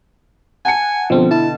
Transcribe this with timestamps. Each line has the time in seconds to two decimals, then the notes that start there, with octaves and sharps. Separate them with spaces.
0.65 F#5 G#5 A5 C#7
1.10 B2 D3 F3 C4
1.31 E4 A5